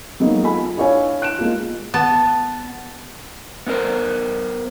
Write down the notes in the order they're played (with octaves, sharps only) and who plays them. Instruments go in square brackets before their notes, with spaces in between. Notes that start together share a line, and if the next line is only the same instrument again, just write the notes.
[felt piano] F#3 G#3 A#3 B3 D#4
F4 A4 G#5 B5
D4 E4 C#5 F5 G#5
F#6 D7 E7
G#3 A#3 F4
[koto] B3 A5
[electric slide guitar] B3 D#4 E4 A#4 C5